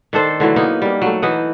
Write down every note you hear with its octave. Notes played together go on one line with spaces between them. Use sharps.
D#3 D4 A4 C5
D3 E3 F#3 A3
A#3 B3 D#4
G3 A#3
F#3 A3
E3 D#4 D#5 F#5